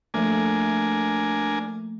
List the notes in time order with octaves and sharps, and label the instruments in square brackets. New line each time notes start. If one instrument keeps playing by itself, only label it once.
[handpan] F3 A3 A#3 [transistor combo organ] D4 A#4 G#5